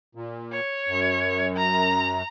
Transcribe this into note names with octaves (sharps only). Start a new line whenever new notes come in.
A#2
C#5
F#2
A#5